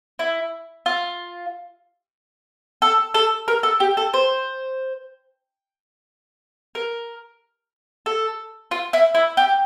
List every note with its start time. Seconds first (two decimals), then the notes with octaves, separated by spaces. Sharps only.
0.19 E4
0.86 F4
2.82 A4
3.14 A4
3.48 A#4
3.63 A4
3.80 G4
3.97 A4
4.14 C5
6.75 A#4
8.06 A4
8.71 F4
8.93 E4
9.15 E4
9.37 G4